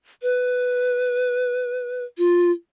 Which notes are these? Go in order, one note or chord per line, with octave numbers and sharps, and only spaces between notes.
B4
F4